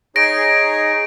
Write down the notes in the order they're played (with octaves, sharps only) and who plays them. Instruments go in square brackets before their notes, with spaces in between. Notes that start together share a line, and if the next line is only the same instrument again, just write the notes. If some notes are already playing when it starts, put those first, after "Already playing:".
[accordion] D#4 G#4 C#5 [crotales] A#6 D7